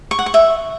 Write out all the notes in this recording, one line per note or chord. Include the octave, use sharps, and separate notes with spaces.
C#6
F#5
C#6
E5